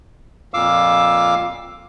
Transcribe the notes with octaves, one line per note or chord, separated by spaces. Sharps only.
F2 A#2 F5 D6 E6